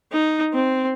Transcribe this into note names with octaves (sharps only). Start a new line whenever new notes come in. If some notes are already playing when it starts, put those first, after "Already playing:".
D#4
C4